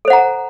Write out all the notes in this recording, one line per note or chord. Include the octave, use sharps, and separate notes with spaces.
A4 C5 F#5 A#5